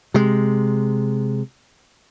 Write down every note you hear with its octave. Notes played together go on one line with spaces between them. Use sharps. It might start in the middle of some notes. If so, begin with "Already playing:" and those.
C3 G#3